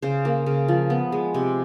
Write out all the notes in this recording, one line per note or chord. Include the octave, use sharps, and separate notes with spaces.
C#3 C5
A#3
C#3
F3
B3
G#3
C3